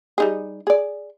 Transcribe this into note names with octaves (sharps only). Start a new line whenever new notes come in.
G3 D#4 G#4
G#4 D5